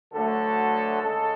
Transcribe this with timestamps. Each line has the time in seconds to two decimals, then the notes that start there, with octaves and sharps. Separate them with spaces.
0.13 D2 D3 F#3 A3 A4
1.02 C#3 G#3 A4